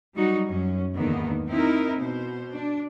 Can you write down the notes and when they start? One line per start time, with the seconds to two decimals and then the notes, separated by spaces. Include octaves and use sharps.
0.15 F#3 G3 D#4 F#4
0.47 F#2 C#4
0.96 E2 G#2 D3 D#3 A#3 B3
1.48 C4 D#4 E4 A#4
1.97 B2 C5
2.54 D4